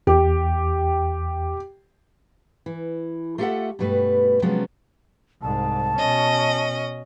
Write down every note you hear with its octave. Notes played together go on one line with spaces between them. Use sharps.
E2 G4
E3
A3 F4 G4 A4 E5 F#5
G2 B2 G3 A3 B4
C3 F3 F#3 G#3 B3 C#4
C2 G#2 A5
B2 C#4 D#5